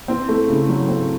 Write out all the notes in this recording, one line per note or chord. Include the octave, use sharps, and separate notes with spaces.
C4 E4
A3
C#3
F#3
C4